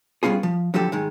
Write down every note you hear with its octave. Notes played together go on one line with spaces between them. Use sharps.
G3 B3 C#4 F4 G#4
F3
D3 F3 F#3 G4 A4
G#2 D#3 G#3